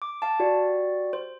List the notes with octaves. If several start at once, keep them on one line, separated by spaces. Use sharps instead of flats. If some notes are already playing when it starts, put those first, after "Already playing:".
D6
F5 A5
F#4 G4 D5
C5